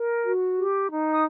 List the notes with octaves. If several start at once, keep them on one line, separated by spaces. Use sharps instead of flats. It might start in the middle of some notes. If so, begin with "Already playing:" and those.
Already playing: A#4
F#4
G4
D#4
D#6